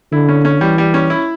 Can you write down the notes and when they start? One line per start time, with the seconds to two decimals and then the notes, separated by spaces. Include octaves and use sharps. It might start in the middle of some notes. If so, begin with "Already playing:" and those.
0.12 D3 E4
0.29 C#4
0.45 C#4
0.61 E3 G3
0.78 G3
0.94 C#4
1.10 E4